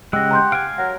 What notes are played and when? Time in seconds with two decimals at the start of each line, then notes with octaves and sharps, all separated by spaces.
0.13 C#3 G#3 G4 F#5 E6 A#6
0.31 A#5 C6 G6
0.52 F5 G#5 D7
0.78 F#3 A#4 F#5